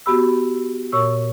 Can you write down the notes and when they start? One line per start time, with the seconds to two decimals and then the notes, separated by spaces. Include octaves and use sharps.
0.06 B3 F#4 G4 B5 E6
0.92 A#2 C#5 C#6 E6